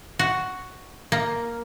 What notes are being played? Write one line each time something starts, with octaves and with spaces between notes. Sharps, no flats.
F#4
A#3